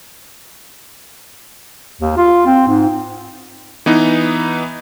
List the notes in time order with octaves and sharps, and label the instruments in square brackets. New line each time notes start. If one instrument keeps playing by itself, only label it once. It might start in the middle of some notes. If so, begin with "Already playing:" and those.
[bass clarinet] D#2
F4
C4
G#2
[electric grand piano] E3 B3 D#4